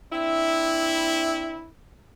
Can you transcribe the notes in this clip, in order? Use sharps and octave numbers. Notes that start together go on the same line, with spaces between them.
C4 D4 E4